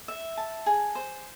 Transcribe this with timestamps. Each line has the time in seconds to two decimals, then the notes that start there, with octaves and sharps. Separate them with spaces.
0.08 E5
0.37 A5
0.66 G#4
0.95 C5